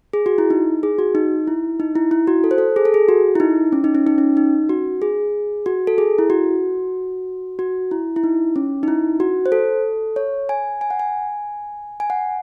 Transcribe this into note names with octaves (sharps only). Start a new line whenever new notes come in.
G#4
F#4
E4
D#4
G#4
F#4
D#4
E4
D#4
E4
E4
F#4
A4
C5
A4
G#4
A4
G#4
F#4
E4
D#4
C#4
D#4
C#4
D#4
C#4
D#4
F#4
G#4
F#4
A4
G#4
E4
F#4
F#4
E4
E4
D#4
C#4
D#4
E4
F#4
C5
A4
C#5
G#5
G#5
F#5
G#5
G#5
F#5